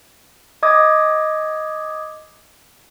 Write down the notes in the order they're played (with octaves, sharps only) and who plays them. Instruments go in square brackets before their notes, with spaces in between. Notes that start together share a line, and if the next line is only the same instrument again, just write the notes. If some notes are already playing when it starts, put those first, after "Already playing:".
[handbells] D#5 D6 D#6 G#6